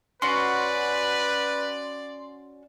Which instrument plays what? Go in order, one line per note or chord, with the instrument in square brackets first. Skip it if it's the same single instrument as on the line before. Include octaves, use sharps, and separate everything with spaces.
[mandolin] C#4 F#4 [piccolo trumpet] B4 [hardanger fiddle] D5 [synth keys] C6